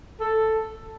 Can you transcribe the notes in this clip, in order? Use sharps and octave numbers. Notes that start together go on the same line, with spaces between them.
A4